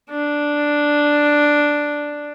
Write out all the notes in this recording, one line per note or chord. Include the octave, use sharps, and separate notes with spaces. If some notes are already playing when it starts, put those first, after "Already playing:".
D4